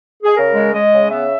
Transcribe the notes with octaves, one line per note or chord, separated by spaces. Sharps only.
G#4
C#3 A#4
G#3
G#3 D#5
C#3
B3 E5